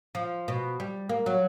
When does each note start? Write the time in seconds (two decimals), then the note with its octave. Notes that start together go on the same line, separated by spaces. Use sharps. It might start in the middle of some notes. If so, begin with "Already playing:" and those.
0.15 F3
0.48 B2
0.80 G3
1.09 A#3
1.26 F#3